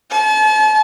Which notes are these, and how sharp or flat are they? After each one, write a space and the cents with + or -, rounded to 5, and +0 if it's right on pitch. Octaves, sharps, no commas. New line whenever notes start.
A5 -40